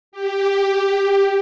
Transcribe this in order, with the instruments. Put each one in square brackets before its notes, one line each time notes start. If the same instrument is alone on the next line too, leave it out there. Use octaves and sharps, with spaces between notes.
[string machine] G4